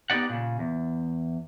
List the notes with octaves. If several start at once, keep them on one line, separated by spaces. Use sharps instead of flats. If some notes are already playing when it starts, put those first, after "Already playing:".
B3 D#4 G4 D5 F#5
A#2 C#3
E2